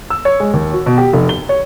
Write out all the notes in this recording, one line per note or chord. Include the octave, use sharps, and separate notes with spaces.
E6
C#5
G#3
D#2
F#4
B2
G4
F1
G7
C#5